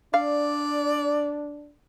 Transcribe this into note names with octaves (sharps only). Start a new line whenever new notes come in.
D4 D5 F5